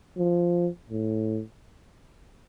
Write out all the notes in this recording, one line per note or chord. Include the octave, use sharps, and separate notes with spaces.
F3
A2